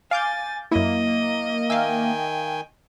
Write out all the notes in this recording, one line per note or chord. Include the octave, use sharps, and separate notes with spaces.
F5 G#5 D6 G6 A6
F#2 A#3 E4 D#5
D#3 E5 F5 G5 G#5